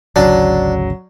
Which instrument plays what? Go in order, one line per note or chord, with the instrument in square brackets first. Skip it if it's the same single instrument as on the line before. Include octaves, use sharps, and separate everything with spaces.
[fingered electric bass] G#1 D2 C#3 [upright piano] F#3 [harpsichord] D4